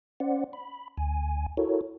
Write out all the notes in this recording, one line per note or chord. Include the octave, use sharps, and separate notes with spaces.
C#4 C5 D5 F#5
B5
D2 G#5
E4 F#4 A4 A#4 C#5